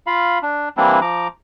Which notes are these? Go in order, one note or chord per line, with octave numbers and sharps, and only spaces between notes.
F4 F5 B5
D4
E3 G3 A#3 C4 D4 E4
F3 A#5 D6